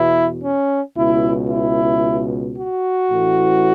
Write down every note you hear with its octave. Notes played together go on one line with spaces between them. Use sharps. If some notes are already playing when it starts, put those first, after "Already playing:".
Already playing: E2 B2 E4
C#4
C#2 B2 E4
E4
F#4
A1 A2 E3